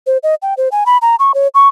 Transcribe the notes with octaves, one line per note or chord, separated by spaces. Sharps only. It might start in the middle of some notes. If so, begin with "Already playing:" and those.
C5
D#5
G5
C5
G#5
B5
A#5
C#6
C#5
C#6